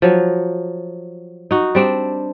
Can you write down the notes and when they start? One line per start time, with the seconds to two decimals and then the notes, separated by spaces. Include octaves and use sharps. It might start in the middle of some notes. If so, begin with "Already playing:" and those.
0.02 F3 F#3
1.51 D#4 F#4
1.75 G3 C4 D4